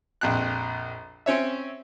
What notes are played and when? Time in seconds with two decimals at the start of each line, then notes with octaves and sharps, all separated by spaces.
0.21 A#1 F2 F#6
1.26 C4 C#4 C#5 E5